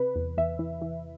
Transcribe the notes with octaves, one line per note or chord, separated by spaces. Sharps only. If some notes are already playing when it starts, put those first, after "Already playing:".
Already playing: C3 B4
E2
E2 E5
E3
E3